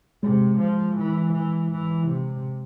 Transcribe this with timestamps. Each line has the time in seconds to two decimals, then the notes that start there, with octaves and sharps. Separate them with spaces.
0.23 C3 G#3
0.59 F3
0.97 E3
1.33 E3
1.71 E3
2.08 C3